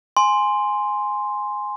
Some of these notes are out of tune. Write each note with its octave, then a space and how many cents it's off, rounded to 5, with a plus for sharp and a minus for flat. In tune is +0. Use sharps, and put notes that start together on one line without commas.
G#5 +0 C6 +0